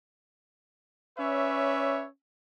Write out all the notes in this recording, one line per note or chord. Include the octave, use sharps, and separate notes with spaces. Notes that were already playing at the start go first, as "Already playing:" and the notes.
C#4 B4 C#5 D5 E5